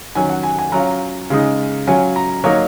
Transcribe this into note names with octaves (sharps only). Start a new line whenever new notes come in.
D#3 F#3 C#4 G#5
F#5
G#5
G#5
F#3 C#4 F4 A#5
C#3 G#3 D#4
F#3 C#4 F4 G#5
A#5
F#3 A#3 D#4 C#5